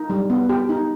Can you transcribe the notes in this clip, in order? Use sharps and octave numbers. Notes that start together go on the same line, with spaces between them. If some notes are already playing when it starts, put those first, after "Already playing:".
Already playing: D#4
G3
B3
G4
D#4